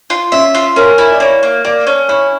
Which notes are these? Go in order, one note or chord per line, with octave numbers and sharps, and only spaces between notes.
F4
C#4 E5
F4
C#4 A#4
E4
D5
A#3 C#5
A#3
A#3 D5
C#4
E4 C#5